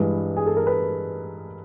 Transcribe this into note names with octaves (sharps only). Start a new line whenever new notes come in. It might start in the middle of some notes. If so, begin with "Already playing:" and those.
Already playing: G2 E3 G#3 B4
G#4
A4
A#4
B4